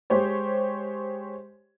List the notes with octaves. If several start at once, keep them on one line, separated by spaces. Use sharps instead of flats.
G#3 G4 C5 C#5